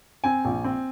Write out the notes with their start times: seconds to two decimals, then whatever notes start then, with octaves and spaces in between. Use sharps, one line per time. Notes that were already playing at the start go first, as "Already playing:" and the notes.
0.24 C4 G#5
0.45 A#1
0.64 C4